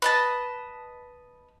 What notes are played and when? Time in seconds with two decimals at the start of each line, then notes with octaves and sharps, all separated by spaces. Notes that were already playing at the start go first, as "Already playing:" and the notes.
0.02 B4 D#5 A5